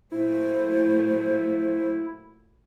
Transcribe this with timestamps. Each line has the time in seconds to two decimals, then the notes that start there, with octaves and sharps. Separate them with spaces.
0.12 A#2 F#3 A3 E4 C5